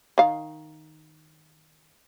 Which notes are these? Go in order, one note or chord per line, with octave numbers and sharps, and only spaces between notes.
D#3 F5